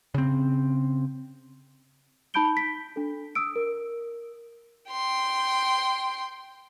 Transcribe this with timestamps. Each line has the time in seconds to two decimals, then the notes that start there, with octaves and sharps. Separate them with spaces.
0.14 C#3 C4
2.34 D#4 A5 B5 G6 D7 G7
2.57 B6
2.96 D4 A4
3.35 D#6 E6 D7
3.56 A#4
4.92 G5 C6